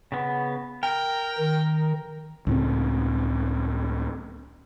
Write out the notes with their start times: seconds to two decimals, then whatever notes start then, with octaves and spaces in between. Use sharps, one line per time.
0.12 C#3 B3
0.83 A#4 G5
1.38 D#3
2.47 C#2 A2 C4